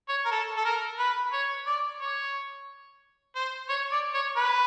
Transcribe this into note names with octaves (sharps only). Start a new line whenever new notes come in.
C#5
A#4
A4
A4
A#4
B4
C#5
D5
C#5
C5
C#5
D5
C#5
B4